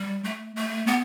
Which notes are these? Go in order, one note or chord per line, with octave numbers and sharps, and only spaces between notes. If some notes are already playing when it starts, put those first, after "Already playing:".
Already playing: G3
A3
A3
B3